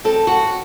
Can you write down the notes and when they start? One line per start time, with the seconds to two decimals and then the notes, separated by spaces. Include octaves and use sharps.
0.04 F#3 C4 D#4 A4
0.27 F#4